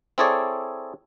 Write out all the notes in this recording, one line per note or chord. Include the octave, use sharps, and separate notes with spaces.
C4 E4 G#4 A4 C#5 D5